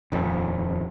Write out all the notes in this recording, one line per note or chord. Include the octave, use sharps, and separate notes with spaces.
D#1 F2